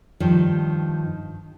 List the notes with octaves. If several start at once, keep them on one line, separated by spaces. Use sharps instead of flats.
G2 D#3 F3